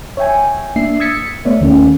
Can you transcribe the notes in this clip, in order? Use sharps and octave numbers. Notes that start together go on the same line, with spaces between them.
C#5 E5 G5 G#5
A#3 D4 E5 C7
D#6 E6 G#6 A6 B6 C#7
A3 B3 C#5 D5 E5
D#2 D#3 A3 A#3 C#4